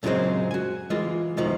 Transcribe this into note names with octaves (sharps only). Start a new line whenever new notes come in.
F#2 A#2 C#3 F#3 G#3 C4
F#4 G#5
E3 G#3 A#3 F4
E2 B2 D#3 F3